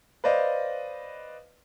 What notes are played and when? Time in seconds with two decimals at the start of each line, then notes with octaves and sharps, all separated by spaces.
0.24 B4 C5 D5 D#5 F5